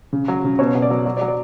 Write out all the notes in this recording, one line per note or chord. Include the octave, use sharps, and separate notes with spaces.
C#3
F#3
C#3
B2 C#5
B2
D5
F#3
F#3 D5
D5
F#3
D5